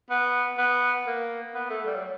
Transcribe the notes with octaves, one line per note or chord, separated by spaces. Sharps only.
B3
B3
A#3
B3
A3
G3
F#3